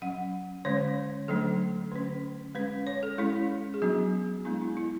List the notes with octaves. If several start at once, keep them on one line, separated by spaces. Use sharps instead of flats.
F#3 C#4 F#5
D3 G#3 C#4 C#5
D3 F#3 A3 D4 A4
D3 A3 C#4 B4
G#3 C#4 B4
C#5
A4
G#3 C#4 E4
G#4
F#3 B3 D4 F#4
G#3 B3 D4 E4
E4
E4